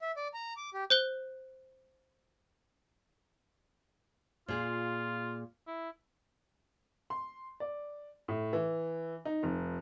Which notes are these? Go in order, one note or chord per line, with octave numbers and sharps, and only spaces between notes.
E5
D5
A#5
D6
G4
C5 F#6 G7
A#2 F4 G#4
E4
C6
D5
A2
E3
D#4
F1